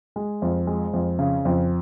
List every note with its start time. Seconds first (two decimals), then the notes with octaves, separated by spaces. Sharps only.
0.16 G#3
0.42 F2
0.67 G#3
0.93 F2
1.19 C#3
1.45 F2